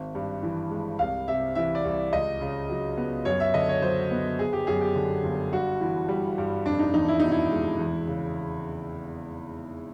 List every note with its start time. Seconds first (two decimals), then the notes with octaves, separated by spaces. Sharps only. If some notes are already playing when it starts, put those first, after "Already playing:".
Already playing: G#1
0.15 G2
0.43 E3
0.70 G#3
0.99 C2 F5
1.28 C3 E5
1.55 E3 E5
1.75 D5
1.85 C2
2.12 C#2 D#5
2.41 C#3
2.69 F#3
2.97 B3
3.25 F#2 C#5
3.40 E5
3.54 D3 D#5
3.69 C#5
3.82 F#3 C5
4.11 B3
4.39 G1 G#4
4.53 G4
4.67 F#2 G#4
4.81 G4
4.96 D3
5.24 G1
5.52 G2 F#4
5.81 E3
6.08 G3
6.38 G2
6.65 F1 D4
6.79 D#4
6.94 E2 D#4
7.08 E4
7.20 B2 D#4
7.32 E4
7.51 G#3
7.79 E2
8.07 C#3